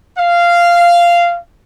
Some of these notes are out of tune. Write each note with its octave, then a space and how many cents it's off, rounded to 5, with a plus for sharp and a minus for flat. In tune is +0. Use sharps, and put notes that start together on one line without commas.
F5 -10